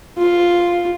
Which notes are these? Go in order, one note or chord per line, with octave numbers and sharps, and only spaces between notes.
F4